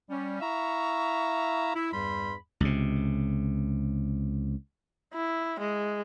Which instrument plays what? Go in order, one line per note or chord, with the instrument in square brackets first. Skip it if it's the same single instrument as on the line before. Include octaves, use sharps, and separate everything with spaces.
[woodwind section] G3 C#4
E4 E5 F5 A#5 C#6
E4
E2 G2 G3 B5 C6
[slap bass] C#2 C3
[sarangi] E4
G#3